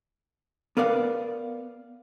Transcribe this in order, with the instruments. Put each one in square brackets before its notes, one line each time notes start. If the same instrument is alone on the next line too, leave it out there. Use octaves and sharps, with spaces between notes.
[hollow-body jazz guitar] B3 A#4 D5 F5 F#5